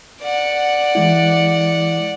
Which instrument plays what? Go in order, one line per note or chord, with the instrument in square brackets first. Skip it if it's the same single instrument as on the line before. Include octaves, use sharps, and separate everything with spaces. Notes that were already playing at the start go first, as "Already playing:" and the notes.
[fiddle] D5 F#5
[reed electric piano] E3 G#3 E4